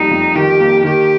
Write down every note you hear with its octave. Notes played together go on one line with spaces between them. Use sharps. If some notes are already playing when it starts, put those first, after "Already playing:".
Already playing: F2 G3 A#3 D#4
F2
D#3 G4
A#3
D#3 G4